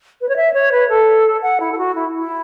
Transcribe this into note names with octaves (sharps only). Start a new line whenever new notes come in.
B4
C#5
E5
C#5
B4
A4
F#5
E4
A4
F#4
E4
E4